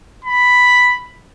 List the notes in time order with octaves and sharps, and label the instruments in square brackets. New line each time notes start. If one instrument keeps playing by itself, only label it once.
[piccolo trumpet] B5